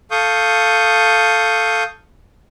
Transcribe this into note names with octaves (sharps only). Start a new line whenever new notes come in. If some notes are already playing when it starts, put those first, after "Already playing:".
A4 F5 C#6 D#6 G6